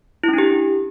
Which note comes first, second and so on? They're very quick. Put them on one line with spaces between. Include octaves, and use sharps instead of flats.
E4 C#4 D4 G4